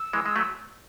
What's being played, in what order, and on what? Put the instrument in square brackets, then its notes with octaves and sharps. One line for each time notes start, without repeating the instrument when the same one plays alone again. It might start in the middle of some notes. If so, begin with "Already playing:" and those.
Already playing: [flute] E6
[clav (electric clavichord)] E3 G#3
G#3
F#3 A3